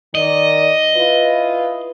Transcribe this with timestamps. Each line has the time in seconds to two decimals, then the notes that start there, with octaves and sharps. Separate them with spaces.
0.15 D#3 D5 D#5
0.97 E4 F4 B4